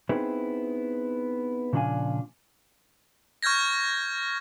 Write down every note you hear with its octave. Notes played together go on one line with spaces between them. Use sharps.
B3 C4 D#4 E4 G#4 C5
A#2 C#3 F3 D4 F5 G#5
C#6 F6 G6 G#6 A#6